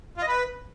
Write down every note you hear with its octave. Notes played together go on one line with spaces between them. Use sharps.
F4
D#5
B4